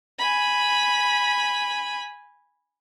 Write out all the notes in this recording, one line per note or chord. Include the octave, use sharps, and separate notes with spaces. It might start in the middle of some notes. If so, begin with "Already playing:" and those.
G#5 B5